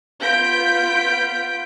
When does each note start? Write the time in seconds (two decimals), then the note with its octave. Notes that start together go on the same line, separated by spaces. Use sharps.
0.21 B3 F4 G6 B6 D7